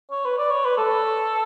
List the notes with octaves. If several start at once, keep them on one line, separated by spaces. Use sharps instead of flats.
C#5
B4
D5
C#5
B4
A4